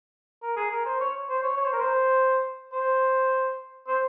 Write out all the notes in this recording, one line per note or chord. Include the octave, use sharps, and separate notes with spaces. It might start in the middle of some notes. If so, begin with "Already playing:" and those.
A#4
G#4
A#4
C5
C#5
C5
C#5
C#5
C5
A#4
C5
C5
C5